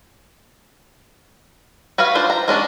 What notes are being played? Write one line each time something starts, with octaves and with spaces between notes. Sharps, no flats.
F#4 B4 C#5 F5
D4 F4 C5
A#5
G#3 C#4 D4 F#4